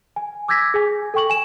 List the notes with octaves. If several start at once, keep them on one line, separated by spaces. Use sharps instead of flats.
G#5
D6 E6 G6 G#6 A#6 B6
G#4 G#5
A4 G5 C#6 F#7
G#5 E7